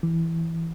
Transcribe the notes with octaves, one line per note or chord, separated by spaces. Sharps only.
E3